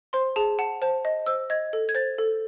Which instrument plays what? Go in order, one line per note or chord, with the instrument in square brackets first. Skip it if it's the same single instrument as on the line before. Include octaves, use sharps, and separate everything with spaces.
[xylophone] C5 C6
G#4 A5
F#5 A5
C5 A5
D#5
C5 E6
D#5 G#6
A4
G#6
C5 A6
A4